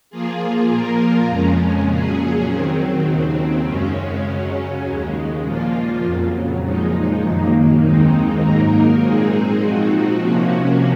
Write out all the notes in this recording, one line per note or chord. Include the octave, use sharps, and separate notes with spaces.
F3 A#3 F4 G#4
A#2 F3 A#3 F4 A#4
F2 C#3 F3 G#3 C#4
A#2 F#3 C#4 G#4
D#3 F#3 C4
D#2 C#3 F#3 C4
F#2 C#3 G#3 C#4
C#3 F#3 C#4
D#2 C#3 G#3
A#2 F3 A#3 F4
F2 C#3 F#3
A#2 F3 G#3 D#4
F#2 D#3 F#3 A#3
D#2 D#3 G#3 C4 D#4
G#2 F#3 A#3 D#4 A#4
A#2 G#3 C4 D#4 G#4
F3 C4 D#4 F#4
C3 F3 A#3 C#4 F#4